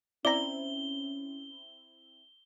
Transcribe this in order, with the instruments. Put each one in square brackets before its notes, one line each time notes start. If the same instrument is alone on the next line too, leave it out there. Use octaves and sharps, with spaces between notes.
[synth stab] C4 E4 [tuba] C#4 [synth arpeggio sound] D5 A#5 [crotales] G7